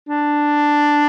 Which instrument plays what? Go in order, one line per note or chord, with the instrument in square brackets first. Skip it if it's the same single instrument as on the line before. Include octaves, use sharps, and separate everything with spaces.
[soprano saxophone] D4